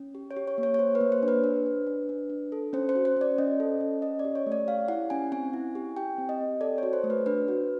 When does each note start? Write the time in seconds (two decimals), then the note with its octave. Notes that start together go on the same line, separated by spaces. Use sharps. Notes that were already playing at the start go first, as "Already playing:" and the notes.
Already playing: C#4
0.15 G4
0.31 C#5
0.37 G4
0.47 C#5
0.58 A#3
0.63 C#5
0.74 C#5
0.79 G4 C5
0.95 B4
1.01 A#3
1.12 C5
1.23 D4
1.28 B4
1.44 D4
1.66 D4
1.87 D4
2.09 D4
2.30 D4
2.52 A4
2.73 C#4 C5
2.89 C5
2.95 F#4
3.05 C5
3.16 C#4 D5
3.38 C#4 D#5
3.60 A4
3.81 C#4
4.02 C#4 D#5
4.19 D5
4.25 G4
4.35 C#5
4.46 A3
4.52 D5
4.67 G4 F5
4.88 E4 F#5
5.10 C#4 G#5
5.32 C4 G#5
5.53 E4
5.75 G4
5.97 G4 G5
6.18 C4
6.29 D#5
6.40 C4
6.61 A4 D5
6.78 F#4 C#5
6.93 C5
7.04 A3
7.10 B4
7.26 D4 B4
7.48 F#4